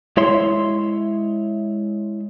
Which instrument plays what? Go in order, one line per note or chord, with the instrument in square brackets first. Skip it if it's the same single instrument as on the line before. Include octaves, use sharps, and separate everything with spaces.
[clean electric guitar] G#3 E4 C#5 E5 C6